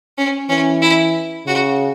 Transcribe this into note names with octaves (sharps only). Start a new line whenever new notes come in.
C#4
E3 C#4
E4
C#3 F#4